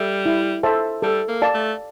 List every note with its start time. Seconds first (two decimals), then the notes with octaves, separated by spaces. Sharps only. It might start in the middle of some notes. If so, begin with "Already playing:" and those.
Already playing: G3 A4 E5
0.26 E4
0.63 A4 C5 E5 A5
1.02 G3 A4
1.28 A#3
1.42 D5 F5 A5
1.54 A3